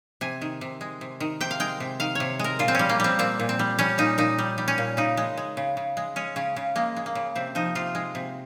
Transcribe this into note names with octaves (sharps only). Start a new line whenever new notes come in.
C3 G#5
D#3
C3
G#3
C3
D#3
C3 G5
F5
G#3 G5
C3
D#3 F5
C3 C#5
G#3 A#4
A#2 F4
C4
G3 C#4
A#3
G3 C4
A#2 C4
A#2
C4
G3
G3 C#4
A#2 D#4
A#2 D#4
G3
G3
C#4
A#2
C#3 D#4
G#3
G#3
C#3
C#3
G#3
G#3 C#4
C#3 C#4
C#3
G#3 A#3
G#3
A#3
C#3
C3 C4
F3 D#4
C3 F4
G#3
C3